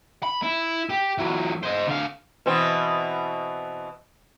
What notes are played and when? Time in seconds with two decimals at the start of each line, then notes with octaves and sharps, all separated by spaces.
0.23 B5
0.43 E4
0.90 G4
1.18 E3 F#3
1.63 C5 D#5
1.87 D3 F5
2.46 B2 E3 C4